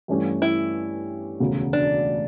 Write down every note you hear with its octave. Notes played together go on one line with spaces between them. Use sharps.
G2 E3 A3 C#4 G4
E4
E1 D2 C#3
D4